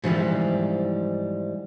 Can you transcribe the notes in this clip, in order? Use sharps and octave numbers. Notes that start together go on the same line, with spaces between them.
G#2 E3 F3 G3